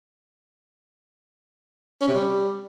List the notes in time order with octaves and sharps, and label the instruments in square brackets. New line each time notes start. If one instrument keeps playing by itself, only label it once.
[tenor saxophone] C#4
C3
G3